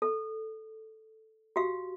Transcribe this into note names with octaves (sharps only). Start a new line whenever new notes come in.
A4
F#4 G4 F5